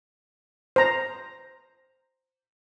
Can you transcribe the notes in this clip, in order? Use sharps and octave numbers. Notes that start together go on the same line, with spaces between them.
C5 A#5